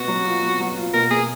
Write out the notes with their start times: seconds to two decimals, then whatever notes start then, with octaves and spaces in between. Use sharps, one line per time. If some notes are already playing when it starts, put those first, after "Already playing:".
Already playing: B2 B3 F#4
0.08 F#3
0.25 F4
0.43 F#3
0.60 F#3
0.77 F4
0.94 B2 A#4
1.11 B2 G#4